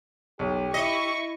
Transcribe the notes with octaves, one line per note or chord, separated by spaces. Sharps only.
B1 G4
E4 D#5 E5 C#6